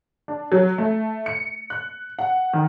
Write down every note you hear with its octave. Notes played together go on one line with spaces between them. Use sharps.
D4
F#3
A3
C#7
F#6
F#5
D#3